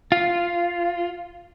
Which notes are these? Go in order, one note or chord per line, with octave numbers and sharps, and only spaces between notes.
F4